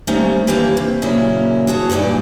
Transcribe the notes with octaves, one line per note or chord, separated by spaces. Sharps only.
G3 A3 A#3 C4 C#4 D#4
E3 A#3 D4 E4 G4 C#5
C3
A#2 C#3 F#3 A#3 C#4 E4
F#4 G#4 A4 C#5
G2 A#2 E3 D#4 D5